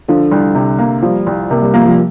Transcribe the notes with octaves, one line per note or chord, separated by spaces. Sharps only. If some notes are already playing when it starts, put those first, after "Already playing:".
D3 F3
C2
C3
A#3
F3 G3
C2
C3 A#3
G3
F3 A#3
F3